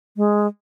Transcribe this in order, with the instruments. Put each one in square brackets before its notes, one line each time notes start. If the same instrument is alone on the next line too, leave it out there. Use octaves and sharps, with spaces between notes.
[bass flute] G#3